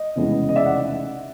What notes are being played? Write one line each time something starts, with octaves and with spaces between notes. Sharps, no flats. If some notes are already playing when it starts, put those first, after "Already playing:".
Already playing: D#5
F1 E2 C#3 E3 G#3
D#5
D5 E5
F#5